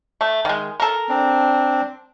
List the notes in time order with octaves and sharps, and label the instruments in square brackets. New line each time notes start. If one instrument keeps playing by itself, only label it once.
[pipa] A3
D#3 G#3
A4 A#4
[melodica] C4 D4